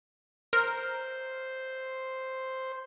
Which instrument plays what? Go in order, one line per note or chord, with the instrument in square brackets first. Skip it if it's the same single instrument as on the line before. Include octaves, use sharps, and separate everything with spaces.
[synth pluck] A#4 [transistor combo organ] C5